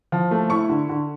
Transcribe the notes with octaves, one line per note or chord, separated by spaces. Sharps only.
F3
A3
E4 C#6
D3
D3